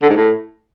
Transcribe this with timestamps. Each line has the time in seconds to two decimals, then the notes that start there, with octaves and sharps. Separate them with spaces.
0.02 D3
0.09 G#2
0.17 A2